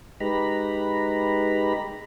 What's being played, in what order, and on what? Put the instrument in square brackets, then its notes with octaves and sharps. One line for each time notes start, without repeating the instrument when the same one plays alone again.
[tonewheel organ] G#3 D#4 G4 B4 A#5 B5